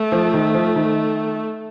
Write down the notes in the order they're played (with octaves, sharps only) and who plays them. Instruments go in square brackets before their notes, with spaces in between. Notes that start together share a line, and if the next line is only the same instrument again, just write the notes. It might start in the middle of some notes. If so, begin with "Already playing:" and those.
Already playing: [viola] A3
[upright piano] F3
D#3
F3
D#3